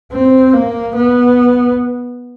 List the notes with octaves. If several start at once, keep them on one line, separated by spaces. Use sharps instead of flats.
C4
A#3
B3